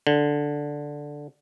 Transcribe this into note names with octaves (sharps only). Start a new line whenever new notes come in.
D3